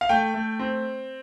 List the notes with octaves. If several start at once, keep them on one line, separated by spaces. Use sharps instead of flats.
F5
A3 G5
A3
C4